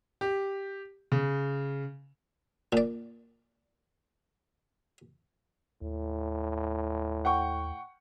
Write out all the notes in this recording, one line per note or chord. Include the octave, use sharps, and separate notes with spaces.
G4
C#3
A#2 D5
D#2 A2
F#5 G5 C#6